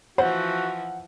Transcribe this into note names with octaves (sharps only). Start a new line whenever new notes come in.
E3 F3 F#4 C5 F#5